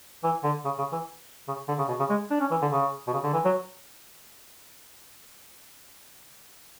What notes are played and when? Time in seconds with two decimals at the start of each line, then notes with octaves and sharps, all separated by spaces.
0.24 E3
0.44 D3
0.65 C#3
0.79 C#3
0.92 E3
1.48 C#3
1.68 D3
1.78 C#3
1.88 B2
2.00 C#3
2.10 G#3
2.31 D4
2.41 C#4
2.51 E3
2.62 D3
2.72 C#3
3.07 B2
3.13 C#3
3.24 D3
3.33 E3
3.45 F#3